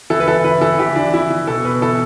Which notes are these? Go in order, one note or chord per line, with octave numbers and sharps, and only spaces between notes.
E3 A4
B4
E3 A4
E3 B4
E3 A4
E3 G4
E3 D4
E3 E4
E3
B2 A4
B2 B4
E3 A4